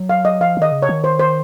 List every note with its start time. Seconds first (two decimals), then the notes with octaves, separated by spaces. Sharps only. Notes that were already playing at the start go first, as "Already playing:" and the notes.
Already playing: F#3
0.09 F5
0.25 D#5
0.40 F3 F5
0.57 D#3 D#5
0.72 C#3
0.82 C#5
0.89 D#3
1.04 C5
1.19 C5